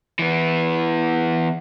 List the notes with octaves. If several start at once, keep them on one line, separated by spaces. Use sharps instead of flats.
E3 B3